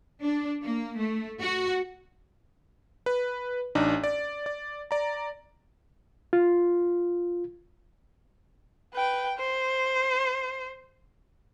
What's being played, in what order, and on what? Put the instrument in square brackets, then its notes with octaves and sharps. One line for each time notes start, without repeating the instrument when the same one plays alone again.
[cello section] D4
A#3
A3
F#4
[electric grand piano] B4
A1 D4 D#4
D5
D5
D5 A#5
[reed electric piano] F4
[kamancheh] B4 G5
C5